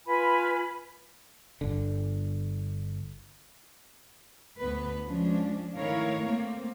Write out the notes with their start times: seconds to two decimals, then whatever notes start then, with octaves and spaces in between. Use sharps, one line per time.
0.06 F4 B4 G#5 B5
1.61 G1 D3
4.59 D2 B3 B4
5.06 F3 G#3 C#4 D4
5.77 D#3 A3 E4 A#4 C#5 F5
6.26 A3 A#3 C4